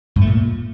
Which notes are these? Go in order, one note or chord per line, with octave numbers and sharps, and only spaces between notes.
G2
A3
A#2